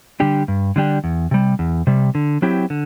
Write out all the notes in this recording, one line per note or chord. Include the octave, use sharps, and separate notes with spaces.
D3 G3 D4 G4
G2
D3 G3 D4 G4
E2
C3 G3
E2
C3 G3
D3
F#3 C4 E4 G4
D3